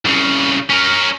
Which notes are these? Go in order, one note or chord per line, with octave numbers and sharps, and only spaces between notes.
C2 C#3
C#4 A#4